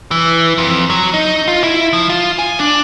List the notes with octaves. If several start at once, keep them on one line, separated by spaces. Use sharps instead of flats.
E3
F2
F#3
D#4
F4
E4
F3
F4
G#5
D4